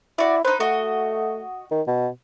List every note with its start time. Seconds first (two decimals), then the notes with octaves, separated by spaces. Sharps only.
0.18 E4 F#4 D5
0.45 D#4 B4 C5
0.60 A3 F#4 D#5
1.71 D#3
1.87 B2